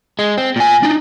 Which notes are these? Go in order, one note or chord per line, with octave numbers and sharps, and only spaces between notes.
G#3
C4
A#2 G#5
D4 D#4